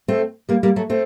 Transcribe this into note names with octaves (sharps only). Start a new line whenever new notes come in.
A3 C4
G3 A#3
G3 A#3
F#3 A3
A3 C4